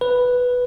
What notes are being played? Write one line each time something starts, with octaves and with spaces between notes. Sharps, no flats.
B4